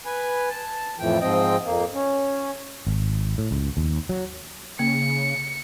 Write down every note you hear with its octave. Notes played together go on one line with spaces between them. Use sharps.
B4 G#5
A5
F2 A2 E3 F3 G5
G#2 F3 C4 D#5 G5
F2 A#3
C#4
G#1
A2
C#2
D#2
F#3
C#3 A#3 C#7